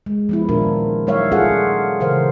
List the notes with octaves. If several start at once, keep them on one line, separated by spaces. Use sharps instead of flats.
G#3
F3 B3 E4
A#2 D#3 D4 F4 A#4
F#3 G3 D#4 C#5 E5 F5
C#4 F4 G#4 A4 F5 F#5
A#2 C#3 E3 A#4 C5 F5